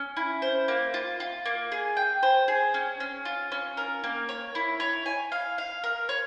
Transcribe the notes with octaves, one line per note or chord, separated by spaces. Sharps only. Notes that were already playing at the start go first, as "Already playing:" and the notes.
Already playing: C#4
E4
C5
A#3
F4
F4
A#3
G#4
G5
C5
G#4
C#4
C#4
F4
C#4
A#4
A#3
C#5
E4
C#5
G#5
F5
F5
A#4
C#5